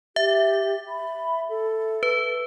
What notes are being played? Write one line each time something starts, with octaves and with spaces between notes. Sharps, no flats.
G4 E5
B5
A4
B4